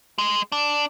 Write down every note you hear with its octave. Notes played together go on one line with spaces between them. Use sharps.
G#3
D4